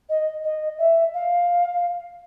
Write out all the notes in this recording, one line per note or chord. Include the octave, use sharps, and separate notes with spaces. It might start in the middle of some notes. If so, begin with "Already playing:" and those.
D#5
D#5
E5
F5